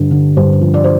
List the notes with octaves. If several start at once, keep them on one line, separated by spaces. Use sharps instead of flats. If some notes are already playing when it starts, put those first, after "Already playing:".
Already playing: G2 D3
D3
G2 C5
F3
D5
C5